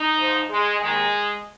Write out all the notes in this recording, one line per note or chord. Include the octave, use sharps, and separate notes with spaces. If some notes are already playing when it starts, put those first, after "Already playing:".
Already playing: D#4
G#2 F3
G#3
D#2 D#3 G#3